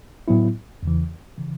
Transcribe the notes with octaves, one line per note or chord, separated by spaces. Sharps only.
A2 F#3 B3 E4
E2 C#3 E3
C#3 E3